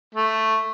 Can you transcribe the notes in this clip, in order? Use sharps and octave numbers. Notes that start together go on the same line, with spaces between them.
A3